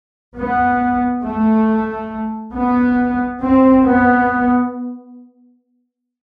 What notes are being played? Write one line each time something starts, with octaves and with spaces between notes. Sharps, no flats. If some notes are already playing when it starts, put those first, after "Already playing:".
B3
A3
B3
C4
B3